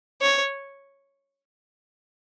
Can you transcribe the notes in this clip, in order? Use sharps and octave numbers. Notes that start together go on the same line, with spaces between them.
C#5